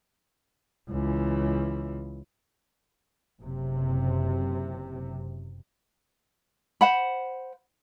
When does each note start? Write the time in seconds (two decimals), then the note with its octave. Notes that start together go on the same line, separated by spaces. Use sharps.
0.89 C#2 E3
3.40 F#1 C3
6.81 C5 F#5 B5